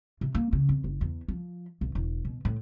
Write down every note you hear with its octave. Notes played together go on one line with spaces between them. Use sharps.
C3
A#3
C#3
F2
F#1
E2
F3
B1
E1
B2
A2